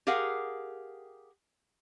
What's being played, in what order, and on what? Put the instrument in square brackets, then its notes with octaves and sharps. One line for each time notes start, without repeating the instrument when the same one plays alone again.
[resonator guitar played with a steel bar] G4 G#4 A#4 F5 F#5